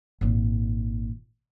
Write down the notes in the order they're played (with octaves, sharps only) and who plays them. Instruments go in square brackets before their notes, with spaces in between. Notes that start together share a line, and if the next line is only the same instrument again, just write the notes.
[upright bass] G#1 A#2